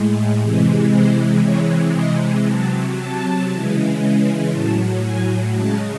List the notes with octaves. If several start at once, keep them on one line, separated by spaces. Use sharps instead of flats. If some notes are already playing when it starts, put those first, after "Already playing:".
Already playing: A2 G#3
C3 E3 G#3
C5
C3 E3 G#3 C#5
D#5
C3 F#3 A5
A5
C#3 E3 G#3
A2 F#3 A5
G#5
C#3 G#3 A5